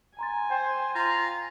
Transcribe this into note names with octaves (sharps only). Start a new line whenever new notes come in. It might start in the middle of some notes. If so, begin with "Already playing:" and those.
G#5 A#5 C6 A6
C5 G5
F4 A#5